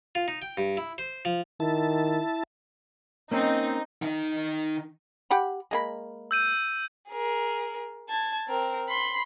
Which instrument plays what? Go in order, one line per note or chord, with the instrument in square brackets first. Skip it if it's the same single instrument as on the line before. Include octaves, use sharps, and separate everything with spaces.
[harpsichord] F4
D#4
G5
G2
E4
C5
F3
[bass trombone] D#3 [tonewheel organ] E4 A5
[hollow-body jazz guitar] A#3 C#4 [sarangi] C4 [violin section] D#4
[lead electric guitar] D#3 D#4
[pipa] G4 F#5 B5
G#3 A#3 B5
[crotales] E6 G6 D#7
[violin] G#4 A#4
A5 G#6
C4 A#4
B5 C6